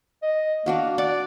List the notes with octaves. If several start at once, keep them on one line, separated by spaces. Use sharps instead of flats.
D#5
A#3 D4 F#4 F5
D5 F#5 D6